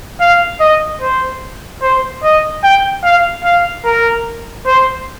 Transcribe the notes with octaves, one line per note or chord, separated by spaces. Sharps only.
F5
D#5
C5
C5
D#5
G5
F5
F5
A#4
C5